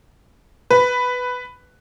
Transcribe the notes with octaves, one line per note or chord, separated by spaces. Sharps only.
B4